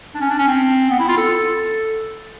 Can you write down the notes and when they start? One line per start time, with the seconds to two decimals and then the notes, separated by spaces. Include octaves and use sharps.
0.15 D4
0.21 C#4
0.30 D4
0.39 C#4
0.48 C4
0.90 B3
1.00 E4
1.09 F4
1.17 A4